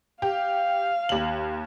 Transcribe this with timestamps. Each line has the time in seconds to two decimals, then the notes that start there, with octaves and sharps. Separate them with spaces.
0.22 G4 F5
1.09 D#2 F#7